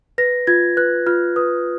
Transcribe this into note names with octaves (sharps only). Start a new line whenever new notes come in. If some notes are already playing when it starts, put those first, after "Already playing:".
B4 A#6
F4 G#6
B4 F#6
F4 F6
B4 D#6